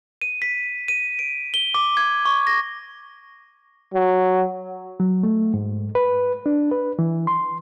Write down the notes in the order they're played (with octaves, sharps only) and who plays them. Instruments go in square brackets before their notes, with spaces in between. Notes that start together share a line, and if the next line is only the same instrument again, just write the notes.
[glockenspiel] D#7
B6
D#7
D7
G7
D6
G#6
C#6
A#6
[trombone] F#3
[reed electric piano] F#3
A3
G#2
B4
D4
B4
E3
C6